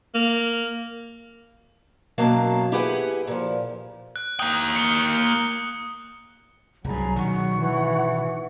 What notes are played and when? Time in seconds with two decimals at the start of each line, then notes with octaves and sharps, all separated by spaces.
0.14 A#3
2.18 F#2 B2 F#3 A#3 F5 A5
2.72 E4 G4 G#4 B4 F#5
3.27 A#2 F3
4.16 F#6
4.39 A#3 G5 D#6
4.76 C#7 G7
6.84 C2 G2 F#3 G#4 A#5 B5
7.16 B2 D#3 F#5 C#6
7.57 E3